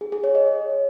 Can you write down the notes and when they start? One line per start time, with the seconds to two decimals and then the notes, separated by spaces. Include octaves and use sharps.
0.01 G#4
0.12 G#4
0.24 C#5
0.35 D#5